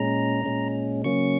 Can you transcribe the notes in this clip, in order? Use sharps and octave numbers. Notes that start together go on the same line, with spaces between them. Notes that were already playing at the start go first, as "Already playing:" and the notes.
Already playing: A#2 G#3 C#4 A#5
A#2 G#3 C#4
C#3 F#3 A#3 C#4 C#6